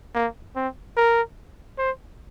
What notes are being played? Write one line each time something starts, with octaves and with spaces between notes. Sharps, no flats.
A#3
C4
A#4
C5